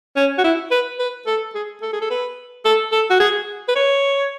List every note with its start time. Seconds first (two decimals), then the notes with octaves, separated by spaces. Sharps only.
0.16 C#4
0.38 F#4
0.44 E4
0.71 B4
1.00 B4
1.27 A4
1.55 G#4
1.82 A4
1.93 G#4
2.01 A4
2.10 B4
2.65 A4
2.92 A4
3.10 F#4
3.20 G#4
3.69 B4
3.76 C#5